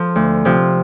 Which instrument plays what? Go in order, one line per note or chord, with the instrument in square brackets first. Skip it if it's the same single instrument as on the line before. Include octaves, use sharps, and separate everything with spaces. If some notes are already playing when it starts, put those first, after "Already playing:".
Already playing: [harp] F3 A4
D2
C3 F3